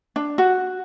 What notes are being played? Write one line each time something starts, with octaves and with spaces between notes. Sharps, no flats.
D4
F#4